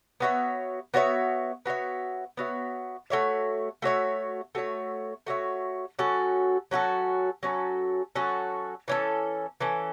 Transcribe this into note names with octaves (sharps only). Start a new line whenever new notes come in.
B3 F#4 C#5 E5
B3 F#4 C#5 E5
B3 F#4 C#5 E5
B3 F#4 C#5 E5
A3 F#4 C#5 E5
A3 F#4 C#5 E5
A3 F#4 C#5 E5
A3 F#4 C#5 E5
F#3 C#4 F#4 A4
F#3 C#4 F#4 A4
F#3 C#4 F#4 A4
F#3 C#4 F#4 A4
E3 C#4 A4
E3 C#4 A4